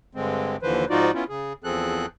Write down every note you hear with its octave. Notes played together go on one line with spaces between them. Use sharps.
G2 D3 G#3 C4
D#2 D3 E3 F3 B4 C5
G#2 F3 D#4 F4 F#4 D5
B3 C#4 E4 F4
C#3 G#4
E2 F3 C4 G#4 A4 F#6